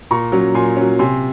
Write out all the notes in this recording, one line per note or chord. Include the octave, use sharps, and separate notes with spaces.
A#2 A#5 C#6
F#3 C#4
A#2 G#5 C6
F#3 C#4
C3 G#5 C6